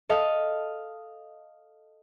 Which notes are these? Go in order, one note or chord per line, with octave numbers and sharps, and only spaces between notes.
A4 D#5 F5